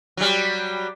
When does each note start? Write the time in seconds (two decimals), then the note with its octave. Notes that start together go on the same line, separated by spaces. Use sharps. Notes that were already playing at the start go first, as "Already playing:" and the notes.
0.17 F#3 G3